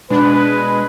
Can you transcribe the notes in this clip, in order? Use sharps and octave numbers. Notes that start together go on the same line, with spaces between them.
B2 G#3 D4 B4